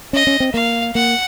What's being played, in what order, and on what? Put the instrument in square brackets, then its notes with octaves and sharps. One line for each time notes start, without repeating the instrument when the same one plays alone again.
[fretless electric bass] C#4 [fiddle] D#5
[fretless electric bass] C#4
C4
[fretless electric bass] A#3 [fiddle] F5
[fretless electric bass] A#3 [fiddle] F#5